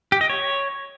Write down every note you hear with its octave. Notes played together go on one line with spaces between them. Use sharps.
G4
D#5
C#5